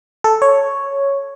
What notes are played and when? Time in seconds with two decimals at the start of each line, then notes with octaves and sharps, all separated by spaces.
0.24 A4
0.42 C#5